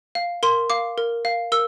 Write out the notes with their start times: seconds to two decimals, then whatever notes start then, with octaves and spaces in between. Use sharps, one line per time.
0.15 F5
0.43 A#4 C6
0.70 F5 D6
0.98 A#4
1.25 F5
1.52 A#4 E6